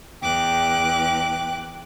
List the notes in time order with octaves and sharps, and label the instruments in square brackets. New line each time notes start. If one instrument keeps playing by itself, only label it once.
[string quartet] E2 D6 F#6 [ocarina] G5